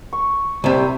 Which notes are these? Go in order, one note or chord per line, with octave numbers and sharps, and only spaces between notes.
C#6
C2 C3